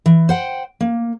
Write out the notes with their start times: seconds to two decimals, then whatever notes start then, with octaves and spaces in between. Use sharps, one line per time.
0.06 E3
0.29 C5 F#5 G5
0.81 A#3